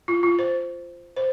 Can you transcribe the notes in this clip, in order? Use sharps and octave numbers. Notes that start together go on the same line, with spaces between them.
F4
F4
C5
C5